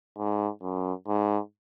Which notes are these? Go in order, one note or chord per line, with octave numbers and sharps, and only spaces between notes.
G#2
F#2
G#2